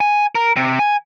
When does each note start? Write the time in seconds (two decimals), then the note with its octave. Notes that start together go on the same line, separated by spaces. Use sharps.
0.01 G#5
0.35 A#4
0.56 C3
0.79 G#5